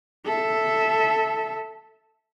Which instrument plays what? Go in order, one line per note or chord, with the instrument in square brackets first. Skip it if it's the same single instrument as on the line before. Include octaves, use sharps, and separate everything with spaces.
[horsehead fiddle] A4 E5